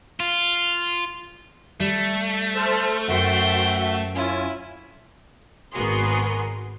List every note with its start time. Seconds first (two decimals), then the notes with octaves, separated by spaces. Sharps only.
0.20 F4
1.80 G3 A3
2.56 A4 C5 F6
3.08 F#2 F#4 A#4 C5 E5 F#5 G5
4.15 C#4 E4 F4 G#5
5.72 G#1 B3 F#4 G#4 A#4 C6